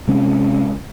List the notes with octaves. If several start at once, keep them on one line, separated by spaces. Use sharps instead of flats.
C3 G#3 C4 C#4